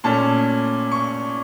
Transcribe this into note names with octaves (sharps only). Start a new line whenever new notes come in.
A#2 A3 C#4 A5
C#6